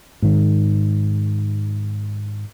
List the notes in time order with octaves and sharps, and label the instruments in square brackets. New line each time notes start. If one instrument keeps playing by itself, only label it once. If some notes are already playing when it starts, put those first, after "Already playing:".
[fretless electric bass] G#2 D#3